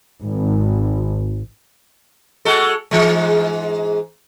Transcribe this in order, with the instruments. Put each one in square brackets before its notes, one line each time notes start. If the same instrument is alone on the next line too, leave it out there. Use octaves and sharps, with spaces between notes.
[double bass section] G#1
[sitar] G#3 F#4 A4
G#2 E3 G#3